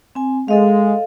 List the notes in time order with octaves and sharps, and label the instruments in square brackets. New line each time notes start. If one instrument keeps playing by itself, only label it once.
[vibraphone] C4 G#5
[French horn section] G#3 [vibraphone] A4 D#5 F5